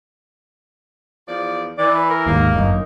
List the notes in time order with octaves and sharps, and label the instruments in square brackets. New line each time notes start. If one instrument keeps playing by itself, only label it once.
[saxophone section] E2 F3 D5
[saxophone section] E3 [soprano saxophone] D5
[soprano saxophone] B4
A#4
[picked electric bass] D#2 G#2 [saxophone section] A#3
[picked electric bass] G1 F#2 [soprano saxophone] D#4